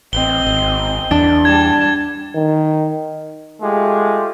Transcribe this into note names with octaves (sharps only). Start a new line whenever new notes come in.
A1 C4 D#5 G7
G#1
E2 D4
G3 A5 G#6
D#3
G#3 A3 F4 G4